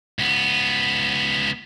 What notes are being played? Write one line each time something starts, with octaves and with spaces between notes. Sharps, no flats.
C#2 B3